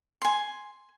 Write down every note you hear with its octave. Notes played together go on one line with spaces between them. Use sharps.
G#5 C6